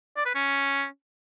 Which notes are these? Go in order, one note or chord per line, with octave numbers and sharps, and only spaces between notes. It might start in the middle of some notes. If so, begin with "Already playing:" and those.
D5
B4
C#4